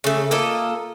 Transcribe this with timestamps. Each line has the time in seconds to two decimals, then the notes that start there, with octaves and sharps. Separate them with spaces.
0.04 C#3 A3
0.31 A#3 F4 A4 D#5